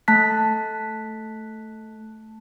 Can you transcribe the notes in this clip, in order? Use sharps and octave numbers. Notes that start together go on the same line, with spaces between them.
A3 A5 F#6 B6